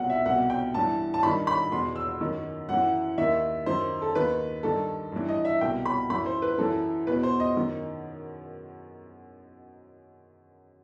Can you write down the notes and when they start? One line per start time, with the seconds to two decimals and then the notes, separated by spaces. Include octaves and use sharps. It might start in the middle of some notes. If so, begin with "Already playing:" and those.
Already playing: C2 B2 F#5
0.10 E5
0.26 C2 F#5
0.29 B2
0.50 G5
0.74 G2 E3 A5
1.14 A5
1.23 G2 B5
1.26 D#3
1.47 B5
1.72 E2 B2 C6
1.96 E6
2.21 F#2 D#3
2.69 F#2 E3 F#5
3.18 D#2 D#3 E5
3.66 F#2 D#3 C5
4.02 A4
4.15 D#2 D#3 B4
4.63 G2 D#3 A4
5.12 G2 E3
5.29 D#5
5.45 E5
5.61 C2 B2 G5
5.85 B5
6.10 F#2 E3 B5
6.26 C5
6.42 B4
6.58 F#2 E3 A4
7.07 E2 B2 B4
7.23 C5
7.40 D#5
7.56 F#2 D#3